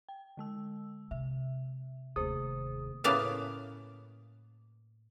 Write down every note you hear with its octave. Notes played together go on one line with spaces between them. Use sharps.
G5
D3 G#3 E6
C3 E5
F1 D#2 G#4 C5 D#6
A2 C#3 A#3 B3 F5 A5